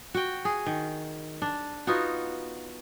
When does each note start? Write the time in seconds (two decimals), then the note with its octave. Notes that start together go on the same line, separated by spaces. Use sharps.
0.14 F#4 G5
0.45 G#4
0.67 D#3
1.42 D4
1.87 B3 D#4 F4 F#4